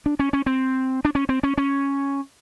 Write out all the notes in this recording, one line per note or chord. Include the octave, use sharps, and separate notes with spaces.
D4
C#4
C#4
C4
D4
C#4
C4
C#4
C#4